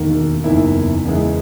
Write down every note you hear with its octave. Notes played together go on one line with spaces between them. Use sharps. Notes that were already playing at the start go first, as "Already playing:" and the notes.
Already playing: E1 D#2 D#3 A#3
F#1 E2 D#3 A#3 E4
E2 C#3 G#3 B3 E4